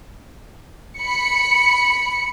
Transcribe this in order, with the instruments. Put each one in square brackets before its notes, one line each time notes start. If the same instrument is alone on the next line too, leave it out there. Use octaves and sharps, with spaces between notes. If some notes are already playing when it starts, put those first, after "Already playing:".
[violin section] B5 C#7